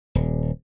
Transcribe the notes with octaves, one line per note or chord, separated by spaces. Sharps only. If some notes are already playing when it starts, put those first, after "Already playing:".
D#1